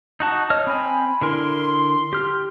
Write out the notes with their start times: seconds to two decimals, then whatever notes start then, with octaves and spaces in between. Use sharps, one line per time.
0.20 D#4 F#4 A5
0.50 C#5 D#5 F6
0.67 C4 G#5 B5
1.21 D3 E4 A#4 C6
2.13 G4 F6